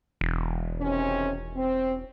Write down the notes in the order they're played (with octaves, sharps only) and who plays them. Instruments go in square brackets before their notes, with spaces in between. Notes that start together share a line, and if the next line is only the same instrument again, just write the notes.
[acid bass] E1
[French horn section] C3 D#3 C#4
C4